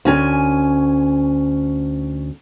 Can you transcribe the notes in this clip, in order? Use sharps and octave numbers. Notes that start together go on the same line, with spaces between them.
D2 C#4 G#5